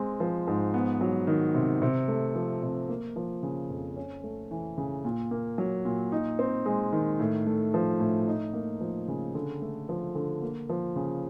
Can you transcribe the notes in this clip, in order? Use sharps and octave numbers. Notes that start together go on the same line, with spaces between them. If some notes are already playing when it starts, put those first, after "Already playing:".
Already playing: G#3 C4
F3
G#2
B3
F#3
D#3
C3
C3
A3
F3
C3
A#3
F3
C#3
F2
C#4
A3
E3
C#3
A#2
A#3
F#3
A#2
D#4
C4
G#3
D#3
A2
A3
F3
A2
D#4
A#3
F3
C#3
D3
A3
F3
D3
A#3
F3
C#3